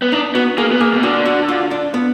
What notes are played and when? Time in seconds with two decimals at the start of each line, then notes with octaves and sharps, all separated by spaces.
0.02 B3
0.12 D4 D#4
0.35 B3 F#4
0.58 A#3 G#4
0.71 B3
0.81 A#3 G#4
0.94 B2
1.03 D3 F#4
1.26 F#4
1.49 F4
1.71 D4
1.94 B3